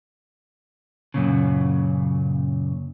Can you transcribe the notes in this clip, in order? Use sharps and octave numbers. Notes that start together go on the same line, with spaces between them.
F#2 A#2 C#3